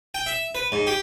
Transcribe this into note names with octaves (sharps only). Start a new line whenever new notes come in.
G5
E5
B4
G#2
G4